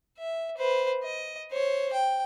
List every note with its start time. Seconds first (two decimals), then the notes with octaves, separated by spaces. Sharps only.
0.18 E5
0.58 B4 C5
1.03 D#5
1.51 C5 C#5
1.93 G5